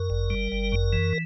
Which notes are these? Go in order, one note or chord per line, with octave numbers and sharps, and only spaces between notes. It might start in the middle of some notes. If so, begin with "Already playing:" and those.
Already playing: F#2 A#4
G1
G3
G1
F#2
E3